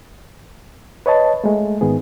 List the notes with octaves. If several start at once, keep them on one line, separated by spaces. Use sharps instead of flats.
B4 C#5 D#5 A5
G#3 A3
G#2 D#3 B3 G#4